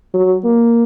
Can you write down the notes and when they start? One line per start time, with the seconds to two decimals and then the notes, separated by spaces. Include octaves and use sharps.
0.14 F#3
0.44 A#3